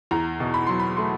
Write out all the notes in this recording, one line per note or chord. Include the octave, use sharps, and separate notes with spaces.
E2 A#5
B2
B5
F#3 C6
B5
A3 C6